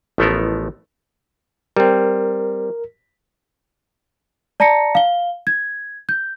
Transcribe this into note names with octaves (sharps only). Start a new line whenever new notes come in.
A1 F3 A3 B3 A4 A#4
G3 C4 A#4
D5 A5 A#5 A#6 C#7
F5 G7
G#6
G6